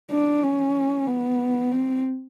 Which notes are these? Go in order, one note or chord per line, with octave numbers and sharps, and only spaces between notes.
D4
C#4
B3
C4